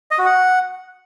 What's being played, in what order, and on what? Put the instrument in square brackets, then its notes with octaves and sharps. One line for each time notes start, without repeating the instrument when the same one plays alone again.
[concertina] D#5
F#4
F#5